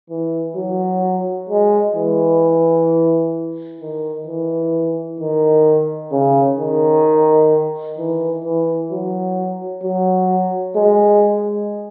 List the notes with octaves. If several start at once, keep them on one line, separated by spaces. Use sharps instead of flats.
E3
F#3
G#3
E3
D#3
E3
D#3
C#3
D#3
E3
E3
F#3
F#3
G#3